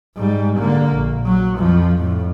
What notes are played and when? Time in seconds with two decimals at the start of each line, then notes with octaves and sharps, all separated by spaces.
0.16 G#2 G3
0.59 D3 A#3
0.94 A#1
1.26 F#3
1.57 F2 F3
1.96 F2 A2